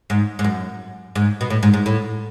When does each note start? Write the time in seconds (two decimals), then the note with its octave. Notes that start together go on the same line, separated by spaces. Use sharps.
0.10 G#2
0.39 G#2
0.44 F#2
1.16 G#2
1.41 B2
1.50 A2
1.63 G#2
1.74 G#2
1.86 A2